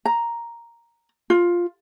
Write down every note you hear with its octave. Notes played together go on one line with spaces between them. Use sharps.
A#5
F4